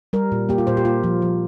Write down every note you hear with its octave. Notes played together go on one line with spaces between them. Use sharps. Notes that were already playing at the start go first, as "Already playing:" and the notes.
G3 A#4
A#2
A#3 G4
F4
A#2 C5
G4
A#3 F4
F3
F3